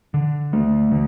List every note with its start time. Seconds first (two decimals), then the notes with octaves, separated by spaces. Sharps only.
0.14 D3
0.53 A3
0.92 D3